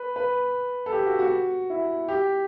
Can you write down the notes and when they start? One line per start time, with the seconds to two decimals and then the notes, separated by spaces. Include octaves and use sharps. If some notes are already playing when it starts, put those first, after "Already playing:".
Already playing: B4
0.16 B4
0.86 A4
0.92 G4
1.06 F#4
1.19 F#4
1.70 E4
2.08 G4